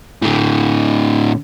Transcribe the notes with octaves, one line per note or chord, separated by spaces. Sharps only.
A2 D3